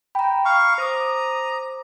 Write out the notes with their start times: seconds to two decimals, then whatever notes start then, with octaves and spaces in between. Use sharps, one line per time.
0.15 G5 A#5 B5
0.45 F5 C#6
0.78 C5 A#5 D6 D#6